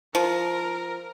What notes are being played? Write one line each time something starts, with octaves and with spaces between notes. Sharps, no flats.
F3 A#4